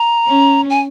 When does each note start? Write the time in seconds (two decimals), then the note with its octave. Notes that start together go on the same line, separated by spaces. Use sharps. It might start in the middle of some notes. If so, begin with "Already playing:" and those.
Already playing: A#5
0.27 C#4
0.70 G#5